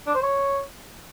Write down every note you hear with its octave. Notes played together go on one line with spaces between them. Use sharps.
D4
C5
C#5